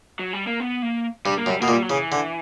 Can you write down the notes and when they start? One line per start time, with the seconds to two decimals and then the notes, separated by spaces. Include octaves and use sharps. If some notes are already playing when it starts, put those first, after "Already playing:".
0.19 F#3
0.33 G3
0.47 A#3
0.60 B3
0.82 A#3
1.26 G2 G3
1.38 A#3
1.46 F#2
1.49 G3
1.61 B2 A#3
1.68 A#2
1.72 G3
1.82 F#3
1.90 C#3 E3
2.12 D3